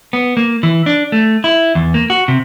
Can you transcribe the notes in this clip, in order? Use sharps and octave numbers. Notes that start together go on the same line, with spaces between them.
B3
A#3
E3
D4
A3
E4
E2
A#3
F#4
C3